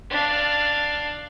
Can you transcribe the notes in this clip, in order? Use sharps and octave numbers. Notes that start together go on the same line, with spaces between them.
D4 F5